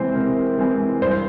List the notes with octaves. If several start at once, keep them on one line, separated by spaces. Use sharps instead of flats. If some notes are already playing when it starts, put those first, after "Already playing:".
Already playing: C3 E3 G#3 C4 C5
C3 A#4
E3 G#3 C4
G2 C5